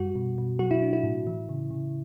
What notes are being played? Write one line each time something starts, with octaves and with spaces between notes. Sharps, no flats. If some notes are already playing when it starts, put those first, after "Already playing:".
Already playing: F#2 G3 F#4
B2
B2
F#3 F#4
E4
D4
E4
A2
E3
C#3
C#3